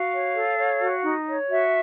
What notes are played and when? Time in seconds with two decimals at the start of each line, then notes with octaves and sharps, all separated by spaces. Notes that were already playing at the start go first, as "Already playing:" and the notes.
Already playing: F#4 F5
0.12 C#5
0.35 A4
0.58 C#5
0.81 F#4
1.04 D#4
1.27 C#5
1.50 F#4 E5